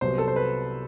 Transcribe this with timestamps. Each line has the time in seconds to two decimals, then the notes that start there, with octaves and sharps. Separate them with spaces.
0.01 C2 C3 F#3 B3 C5
0.18 A4
0.28 C5
0.36 B4